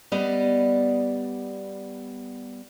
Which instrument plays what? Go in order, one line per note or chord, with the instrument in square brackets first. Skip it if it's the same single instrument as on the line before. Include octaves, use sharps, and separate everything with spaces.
[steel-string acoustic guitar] G3 B3 D5 D#5